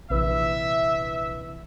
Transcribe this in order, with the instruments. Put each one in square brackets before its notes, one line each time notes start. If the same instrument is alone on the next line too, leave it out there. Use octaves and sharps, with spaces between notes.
[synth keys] A#1 B4 E6 [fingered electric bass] C3 E3 [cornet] E5